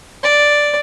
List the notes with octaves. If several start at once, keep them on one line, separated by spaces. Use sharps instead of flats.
D5